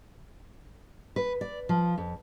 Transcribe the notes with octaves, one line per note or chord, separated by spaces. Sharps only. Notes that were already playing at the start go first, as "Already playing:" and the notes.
B4
D5
F3
F2